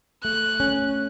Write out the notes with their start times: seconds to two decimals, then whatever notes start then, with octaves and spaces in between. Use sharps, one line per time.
0.24 A3 F#6
0.60 C#4